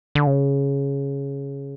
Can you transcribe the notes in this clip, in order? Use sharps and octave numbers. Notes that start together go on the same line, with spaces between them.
D3
C#3